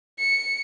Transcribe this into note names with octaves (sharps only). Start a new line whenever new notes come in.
C#7